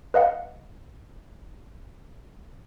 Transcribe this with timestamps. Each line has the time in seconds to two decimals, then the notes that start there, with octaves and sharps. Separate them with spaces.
0.14 B4 D#5 F5 F#5